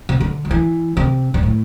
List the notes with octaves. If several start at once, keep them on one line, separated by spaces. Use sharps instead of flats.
C3
D3
F#3
E3
C3
G2
A2